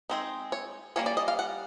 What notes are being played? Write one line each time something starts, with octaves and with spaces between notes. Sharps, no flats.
G#3 C4 D#4
C#5
G3 A#3 C#4 C#5
D5
D#5
F5
F#5